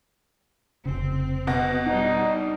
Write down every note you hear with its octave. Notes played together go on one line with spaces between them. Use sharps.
F1 C#3 C4
B2 F#5 A#6
G3 D4 D#4